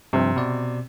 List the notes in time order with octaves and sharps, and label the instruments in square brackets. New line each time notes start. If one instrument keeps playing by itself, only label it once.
[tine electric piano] G2 F3 [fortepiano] C3
[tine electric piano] B2 D5